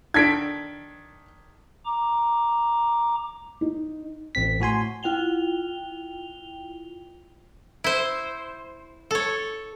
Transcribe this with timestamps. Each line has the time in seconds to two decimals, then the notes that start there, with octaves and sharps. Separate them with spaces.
0.14 D#3 D4 A4 G#6 B6 D7
1.85 A#5 D6
3.61 D#4
4.35 A1 C4 B6
4.60 A2 F#4 G#5 C6
5.03 E4 F4 G5 F7 G7
7.84 E4 C5
9.11 A4 C#5